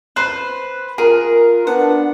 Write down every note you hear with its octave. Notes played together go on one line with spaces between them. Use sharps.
B4 C5 F#6
F4 G#4 A#4
B3 D4 F#5